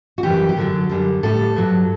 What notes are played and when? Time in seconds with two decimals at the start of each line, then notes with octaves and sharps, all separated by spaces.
0.18 F#4
0.23 F#2 C#3 E3 G3 G4
0.49 G4
0.56 F#2 D3 F#3 A4
0.89 F#2 D3 G3
1.23 A2 G3 A4
1.56 G2 F#3